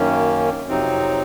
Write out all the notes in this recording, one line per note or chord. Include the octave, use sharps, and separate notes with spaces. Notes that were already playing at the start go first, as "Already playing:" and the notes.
Already playing: F#2 D#3 A#3 C#4
F2 C3 F#3 C4 D#4